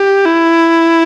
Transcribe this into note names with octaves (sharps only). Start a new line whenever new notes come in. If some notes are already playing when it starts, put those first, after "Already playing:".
Already playing: G4
E4